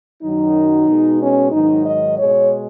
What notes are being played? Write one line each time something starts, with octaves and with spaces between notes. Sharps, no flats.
F#2 D#3 F#3 D#4
B2 G#3
C#4
G#2 D#3 F#3 D#4
D#5
B2 G#3 C#5